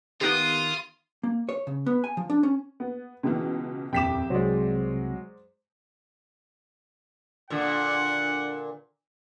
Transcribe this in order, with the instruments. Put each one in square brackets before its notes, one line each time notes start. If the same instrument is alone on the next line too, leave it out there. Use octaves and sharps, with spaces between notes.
[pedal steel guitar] D#3 F#6 [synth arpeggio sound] B3 D#4 G4 [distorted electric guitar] F4 [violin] D#6
[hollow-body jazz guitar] A#3
C#5
C#3
B3
G#5
F3
D4
C#4
[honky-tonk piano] B3
C#2 B2 E3
[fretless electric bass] D#1 F2 [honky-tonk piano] C2 D6 [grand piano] G5 B6 E7
[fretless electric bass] C2 [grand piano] F#3 G#3 [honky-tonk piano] C5 D5
[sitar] A#2 D3 [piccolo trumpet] F#5